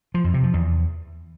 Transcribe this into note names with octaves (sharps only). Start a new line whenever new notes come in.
F3
F2
C3
F3
E2